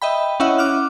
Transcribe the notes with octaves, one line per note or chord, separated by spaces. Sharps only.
D#5 E5 G5 B5
C#4 E4 C#5 D#5 E5 F#5
D6 F6 F#6